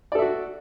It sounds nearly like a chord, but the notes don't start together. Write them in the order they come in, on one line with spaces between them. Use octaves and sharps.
D5 A4 E5 F#4